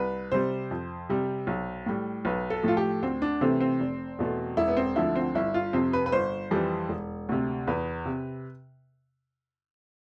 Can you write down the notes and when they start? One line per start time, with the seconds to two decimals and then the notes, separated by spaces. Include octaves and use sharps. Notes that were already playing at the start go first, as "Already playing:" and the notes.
Already playing: C2 B4
0.32 C3 G3 C5
0.71 F2
1.09 C3 G3
1.47 B1
1.86 A2 G3
2.25 B1 B4
2.50 A4
2.63 A2 F3 A3 F4
2.77 G4
3.02 D2 C4
3.22 D4
3.41 C3 E3 A3 C4
3.60 C4
3.80 F1
4.19 E2 B2 A3
4.57 E1 E4
4.68 B3
4.77 C4
4.96 D2 D3 F3 E4
5.16 C4
5.35 G1 E4
5.54 F4
5.73 F2 C3 C4
5.93 B4
6.06 B4
6.12 G1 C5
6.51 F2 E3 G3
6.89 E1
7.29 D2 C3
7.67 E2 B4
8.06 C3